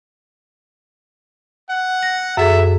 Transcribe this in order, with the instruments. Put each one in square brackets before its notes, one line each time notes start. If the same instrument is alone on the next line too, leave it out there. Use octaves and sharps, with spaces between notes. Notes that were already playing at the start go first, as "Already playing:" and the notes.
[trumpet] F#5
[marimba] A#6
[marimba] F#2 G#4 A4 [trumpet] E5